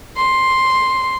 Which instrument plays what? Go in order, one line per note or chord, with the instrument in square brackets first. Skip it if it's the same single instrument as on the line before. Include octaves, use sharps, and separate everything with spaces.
[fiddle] C6